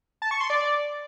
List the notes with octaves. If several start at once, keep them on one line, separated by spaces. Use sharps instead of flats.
A5
C#6
C6
D5